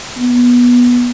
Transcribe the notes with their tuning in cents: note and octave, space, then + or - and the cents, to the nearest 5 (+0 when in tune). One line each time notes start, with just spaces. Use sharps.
B3 -20